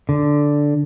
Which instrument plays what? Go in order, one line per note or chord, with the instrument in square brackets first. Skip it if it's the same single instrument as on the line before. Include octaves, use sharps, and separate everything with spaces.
[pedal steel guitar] D3